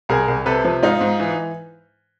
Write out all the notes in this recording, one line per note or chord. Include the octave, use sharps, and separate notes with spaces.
C2 G#4 A#4
C2
C3 A4 B4
F3
G#2 D#4 F4
G#2
E3